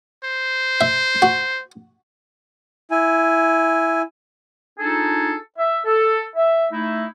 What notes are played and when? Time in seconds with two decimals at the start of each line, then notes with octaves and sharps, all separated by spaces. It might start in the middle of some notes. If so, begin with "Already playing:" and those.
0.25 C5
0.81 E5
1.22 F#4
2.91 E4 G#5
4.79 D4 D#4 F4 G#4 A4
5.58 E5
5.85 A4
6.36 E5
6.71 A3 D#4 E4